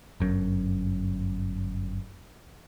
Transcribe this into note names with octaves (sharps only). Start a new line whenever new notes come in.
G1 F#2